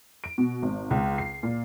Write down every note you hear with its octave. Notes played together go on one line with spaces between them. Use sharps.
D7
B2
G#1
C#2
C7
A#2